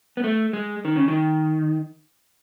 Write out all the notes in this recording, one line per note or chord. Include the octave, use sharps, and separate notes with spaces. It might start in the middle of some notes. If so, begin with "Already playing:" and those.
B3
A3
G#3
D#3
C#3
D#3